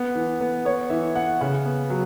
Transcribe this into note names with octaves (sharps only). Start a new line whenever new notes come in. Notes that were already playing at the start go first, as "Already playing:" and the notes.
Already playing: B3
E3
B3
B3 C#5
E3 E5
B3 F#5
C#3 F#5
B3
F#3